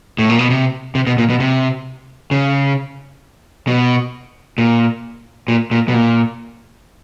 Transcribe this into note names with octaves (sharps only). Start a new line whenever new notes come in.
A2
A#2
B2
C3
C3
B2
A#2
B2
C3
C#3
B2
A#2
A#2
A#2
B2
A#2